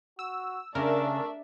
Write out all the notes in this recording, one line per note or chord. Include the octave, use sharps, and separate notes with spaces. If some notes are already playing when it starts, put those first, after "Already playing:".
F#4 E6
C#3 A3 D4 A#4 D5 E5